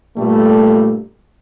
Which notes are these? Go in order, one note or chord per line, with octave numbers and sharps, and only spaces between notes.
G2 A#2 G3 A3